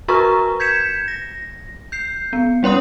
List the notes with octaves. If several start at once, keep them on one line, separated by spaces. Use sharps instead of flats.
F#4 A#4 B4 A#5 C#6
G6 G#6 B6 C#7 E7
A#6
G6 C7
B3
G3 C#4 C#5 C6 D#6